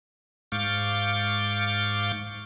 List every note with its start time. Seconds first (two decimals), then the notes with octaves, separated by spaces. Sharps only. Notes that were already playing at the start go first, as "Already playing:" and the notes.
0.52 G#2 F5 C#6 D6 G6 A6